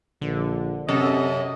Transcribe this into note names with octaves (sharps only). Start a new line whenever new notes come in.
A#1 D3
F#2 C3 A4 D#5